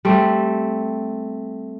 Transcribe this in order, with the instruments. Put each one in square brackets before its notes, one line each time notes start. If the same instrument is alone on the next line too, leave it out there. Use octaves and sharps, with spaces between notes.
[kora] G3 A3 C4